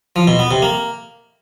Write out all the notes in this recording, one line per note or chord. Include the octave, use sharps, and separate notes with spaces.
F3
B2
B3
C3
A#3